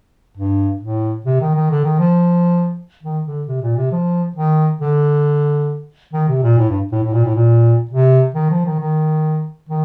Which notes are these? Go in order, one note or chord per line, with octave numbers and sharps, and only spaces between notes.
G2
A2
C3
D#3
D#3
D3
D#3
F3
D#3
D3
C3
A#2
C3
F3
D#3
D3
D#3
C3
A#2
A2
G2
A2
A2
A#2
A2
A#2
C3
D#3
F3
D#3
D#3
D#3